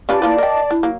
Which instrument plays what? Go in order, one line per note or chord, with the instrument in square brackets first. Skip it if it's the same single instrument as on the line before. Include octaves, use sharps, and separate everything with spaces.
[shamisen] C#4 F4 B4 [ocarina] G4 [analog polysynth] D5 A5
[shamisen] A#3 F4 B4 [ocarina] E4
[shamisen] A#4 G5 [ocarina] D#5
[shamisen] D4 [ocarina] E4
[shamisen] F#3 A#3